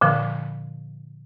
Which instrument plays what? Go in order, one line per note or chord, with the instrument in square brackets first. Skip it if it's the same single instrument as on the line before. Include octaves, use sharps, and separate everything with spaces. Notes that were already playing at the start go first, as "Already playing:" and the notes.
[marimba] A#2 D3 F3